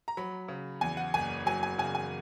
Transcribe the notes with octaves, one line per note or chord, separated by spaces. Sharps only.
A#5
F#3 B5
C#3
E2 G#5
F#5
F#1 G#5
F#3 G#5
G#5
C#3 G#5
G#5